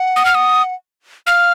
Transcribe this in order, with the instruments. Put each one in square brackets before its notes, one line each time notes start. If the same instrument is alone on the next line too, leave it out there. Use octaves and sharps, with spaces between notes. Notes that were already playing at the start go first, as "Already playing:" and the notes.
Already playing: [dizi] F#5
[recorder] D#6
F6
D#6
[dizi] F5 [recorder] F6